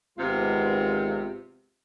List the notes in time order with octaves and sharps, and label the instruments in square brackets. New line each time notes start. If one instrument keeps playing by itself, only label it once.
[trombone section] G#1 G#3 B3 [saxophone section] C3 F4